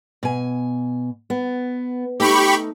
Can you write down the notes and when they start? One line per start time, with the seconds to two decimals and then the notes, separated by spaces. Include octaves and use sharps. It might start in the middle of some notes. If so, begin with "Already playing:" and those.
0.23 B2 G#5
1.30 B3
2.20 A3 D#4 G4 B5 C#6